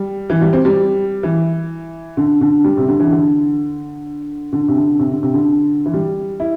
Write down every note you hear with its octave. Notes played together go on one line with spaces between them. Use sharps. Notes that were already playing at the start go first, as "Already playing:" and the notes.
Already playing: G3
E3
G3
C4
G3
E3
D3
D3
G3
C3
D3
E3
D3
D3
C3
D3
C3
D3
C3
D3
E3
G3
E4